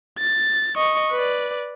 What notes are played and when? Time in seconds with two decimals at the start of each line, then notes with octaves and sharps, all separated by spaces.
0.19 A6
0.76 D#5 C#6
1.12 B4 D5